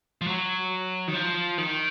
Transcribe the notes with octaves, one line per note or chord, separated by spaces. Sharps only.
F3
F#3
D#3
F3
D#3